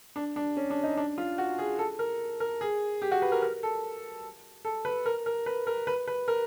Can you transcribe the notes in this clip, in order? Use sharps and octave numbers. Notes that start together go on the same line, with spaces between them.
D4
D4
C#4
D4
D#4
D4
F4
F#4
G#4
A4
A#4
A#4
G#4
G4
F#4
B4
A#4
A#4
A4
A4
B4
A#4
A#4
B4
A#4
B4
B4
A#4